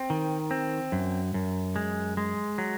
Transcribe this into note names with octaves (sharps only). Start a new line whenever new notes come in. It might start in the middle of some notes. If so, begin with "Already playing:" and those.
Already playing: C4
D#3
C4
F#2
F#2
G#3
G#3
F#3